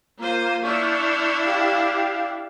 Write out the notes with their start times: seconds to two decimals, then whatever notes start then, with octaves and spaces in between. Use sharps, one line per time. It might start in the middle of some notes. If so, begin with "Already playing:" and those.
0.18 A#3 F4 C5 D#7
0.63 D4 E4 C#6 F6 G6
1.41 G4 F5